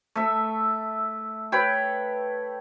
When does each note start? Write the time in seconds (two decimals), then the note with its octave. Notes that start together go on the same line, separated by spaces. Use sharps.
0.15 A3 E5
1.52 B4 C#5 G5